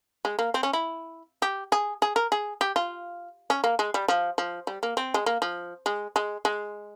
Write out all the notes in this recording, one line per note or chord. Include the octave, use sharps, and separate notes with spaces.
G#3
A#3
C4
C#4
E4
G4
G#4
G#4
A#4
G#4
G4
F4
C#4
A#3
G#3
G3
F3
F3
G3
A#3
C4
G#3
A#3
F3
G#3
G#3
G#3